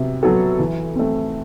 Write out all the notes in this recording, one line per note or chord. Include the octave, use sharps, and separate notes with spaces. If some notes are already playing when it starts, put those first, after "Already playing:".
Already playing: C3 F#3 B3
F#3 B3 F#4 A4
E3
A3 C4